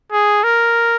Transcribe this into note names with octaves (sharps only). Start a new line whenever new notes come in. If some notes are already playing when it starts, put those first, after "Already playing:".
G#4
A#4